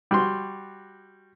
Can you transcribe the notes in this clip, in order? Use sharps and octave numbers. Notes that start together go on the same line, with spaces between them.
G3 F#4 C6